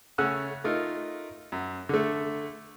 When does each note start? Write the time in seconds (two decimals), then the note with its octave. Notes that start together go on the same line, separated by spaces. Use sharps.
0.18 C#3 A3 C#4 F#5 E6 F#6
0.64 A3 D#4 F4 A#4
1.52 F#2
1.89 D3 A3